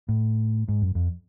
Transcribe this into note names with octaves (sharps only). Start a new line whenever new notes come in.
A2
G#2
F#2
F2